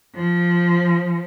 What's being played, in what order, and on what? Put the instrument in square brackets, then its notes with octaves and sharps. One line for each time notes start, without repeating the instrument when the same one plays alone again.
[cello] F3